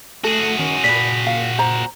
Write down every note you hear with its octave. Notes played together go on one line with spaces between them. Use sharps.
A3 F#4 G#4 A4
D#3 C#4
A#2 B4 D5 B6
F5
C5 A#5